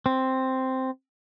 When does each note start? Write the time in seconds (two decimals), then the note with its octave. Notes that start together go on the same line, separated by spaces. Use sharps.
0.06 C4